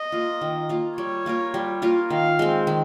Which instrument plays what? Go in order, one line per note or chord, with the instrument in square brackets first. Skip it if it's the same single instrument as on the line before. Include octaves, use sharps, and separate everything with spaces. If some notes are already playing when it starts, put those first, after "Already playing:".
Already playing: [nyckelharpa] D#5
[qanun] A#3 F4
D#3
A#3 F4
[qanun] G3 [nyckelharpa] C#5
[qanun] A#3 F4 A#4
G3
A#3 F4 A#4
[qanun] D#3 [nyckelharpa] F5
[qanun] G#3 C4
D#3